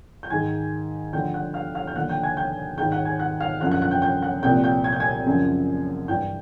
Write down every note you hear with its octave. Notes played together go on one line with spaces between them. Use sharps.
G6
G#2 D#3 G#5 G#6
D2 D3 F3 G5 G6
F#5 F#6
F5 F6
F5 F6
G6
D#2 D3 F3 F#5 F#6
G5 G6
G#5 G#6
G5 G6
G#2 D#3 G5 G6
F#5 F#6
G#5 G#6
F#5 F#6
F5 F6
F#2 D3 F3 F#5 F#6
F#5 F#6
F#5 F#6
G5 G6
G5 G6
F#5 F#6
C2 A#2 F3 G5 G6
G5 G6
G#6
G6
G#5 G#6
F#2 C#3 F3
G2 E3 G5 G6